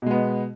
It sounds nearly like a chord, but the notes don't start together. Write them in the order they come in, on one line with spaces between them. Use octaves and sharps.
B2 G#3 B3